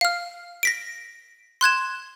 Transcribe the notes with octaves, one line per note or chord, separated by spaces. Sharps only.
F5 F6
A#6 B6 D7
C6 F#6 G#6 E7